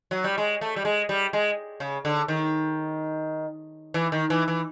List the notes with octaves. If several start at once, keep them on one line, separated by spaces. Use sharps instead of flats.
F#3
G3
G#3
A3
G3
G#3
G3
G#3
C#3
D3
D#3
E3
D#3
E3
E3